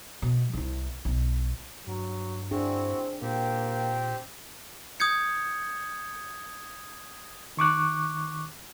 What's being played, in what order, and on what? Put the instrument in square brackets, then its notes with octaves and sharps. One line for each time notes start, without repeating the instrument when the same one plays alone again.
[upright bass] B2
C2 E4
B1
[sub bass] G2 [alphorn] F#3
[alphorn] C4 [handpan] D4 G#4 [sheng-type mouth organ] E4 F#4
[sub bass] A#2 [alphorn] A#3 [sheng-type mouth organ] C4 G4
[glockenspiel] D#6 G6 G#6 C#7
[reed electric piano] D#3 C#6 D6 F#6